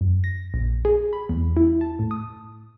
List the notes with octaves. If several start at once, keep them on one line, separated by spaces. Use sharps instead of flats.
F#2
A#6
A#1
G#4
B5
E2
E4
A5
A2
D#6